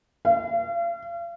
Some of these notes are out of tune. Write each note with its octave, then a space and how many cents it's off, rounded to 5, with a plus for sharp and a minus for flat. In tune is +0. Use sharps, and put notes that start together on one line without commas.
F5 -40